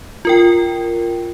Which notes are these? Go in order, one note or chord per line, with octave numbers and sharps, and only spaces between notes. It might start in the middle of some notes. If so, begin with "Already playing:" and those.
F4 A#4 G5